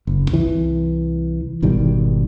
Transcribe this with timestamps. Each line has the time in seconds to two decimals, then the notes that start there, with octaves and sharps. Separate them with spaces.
0.07 F#1
0.31 C2 E3
1.62 G#1 B2 D#3 G3